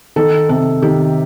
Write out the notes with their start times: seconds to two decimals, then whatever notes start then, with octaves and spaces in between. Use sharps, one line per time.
0.16 D#3 A4
0.49 C3 A4
0.82 D#3 G4